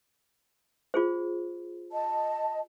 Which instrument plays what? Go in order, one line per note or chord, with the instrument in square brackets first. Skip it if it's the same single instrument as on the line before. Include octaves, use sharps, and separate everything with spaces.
[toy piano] F4 G#4 C5
[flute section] D#5 A5